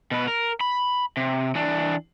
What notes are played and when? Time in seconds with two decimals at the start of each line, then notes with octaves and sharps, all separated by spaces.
0.11 B2 B4
0.28 A#4
0.61 B5
1.17 C3
1.55 E3 D4